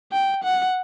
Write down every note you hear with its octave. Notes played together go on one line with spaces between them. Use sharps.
G5
F#5